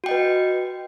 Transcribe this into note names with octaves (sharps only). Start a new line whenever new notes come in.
F#4 B4 D#5 G5